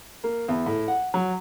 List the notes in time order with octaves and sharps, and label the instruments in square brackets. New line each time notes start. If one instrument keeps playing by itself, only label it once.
[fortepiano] A#3
E2
A2
F#5
F#3